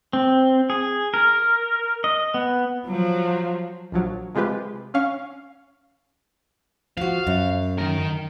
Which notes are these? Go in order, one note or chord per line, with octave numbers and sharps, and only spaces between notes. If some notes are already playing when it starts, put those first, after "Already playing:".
C4
G#4
A#4
D#5
B3
F3 F#3
A#1 F3 F#3
C3 G#3 F4 G4 B4
C#4 F5 C#6
F3 F#4 F5
F#2
D#3 A#4